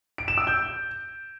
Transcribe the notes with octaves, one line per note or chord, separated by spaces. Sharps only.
D7
E7
E6
G6